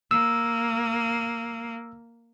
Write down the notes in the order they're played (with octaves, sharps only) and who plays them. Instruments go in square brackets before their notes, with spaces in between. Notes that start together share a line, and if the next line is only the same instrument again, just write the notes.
[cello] A#3 [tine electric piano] E6